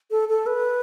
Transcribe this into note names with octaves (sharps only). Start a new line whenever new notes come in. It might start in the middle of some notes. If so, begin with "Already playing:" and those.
A4
A4
B4